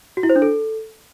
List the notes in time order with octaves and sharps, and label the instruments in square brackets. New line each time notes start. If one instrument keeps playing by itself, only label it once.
[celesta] F#4
E4
C5
D4
A4